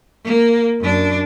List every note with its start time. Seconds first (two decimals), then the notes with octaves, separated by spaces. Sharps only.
0.25 A#3
0.80 F#2 D4